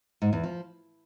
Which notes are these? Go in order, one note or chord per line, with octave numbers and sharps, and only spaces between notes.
G#2
E2
F3